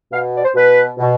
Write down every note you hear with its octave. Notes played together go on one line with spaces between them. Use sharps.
B2 F5
D5
C5
B2 B4
B2